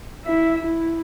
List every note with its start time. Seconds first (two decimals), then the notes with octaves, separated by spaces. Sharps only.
0.25 E4 E5
0.62 E4